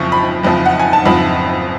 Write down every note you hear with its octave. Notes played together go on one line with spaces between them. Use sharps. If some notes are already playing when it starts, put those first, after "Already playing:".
Already playing: F#1 F2 F3 C#6
B5
F#1 F2 F3
F#5
G#5
A5
F#1 F2 F3 B5